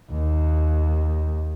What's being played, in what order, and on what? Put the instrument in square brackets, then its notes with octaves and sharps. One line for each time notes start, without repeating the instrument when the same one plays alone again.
[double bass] D#2